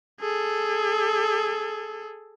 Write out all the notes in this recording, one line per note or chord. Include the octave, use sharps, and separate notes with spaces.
G#4 A4